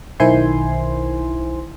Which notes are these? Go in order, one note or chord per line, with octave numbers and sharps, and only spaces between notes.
B1 D#3 E4 C5 G#5 C6